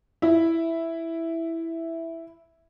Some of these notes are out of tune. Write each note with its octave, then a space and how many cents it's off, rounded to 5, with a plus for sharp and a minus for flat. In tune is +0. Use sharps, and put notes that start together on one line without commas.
E4 +0 E5 +0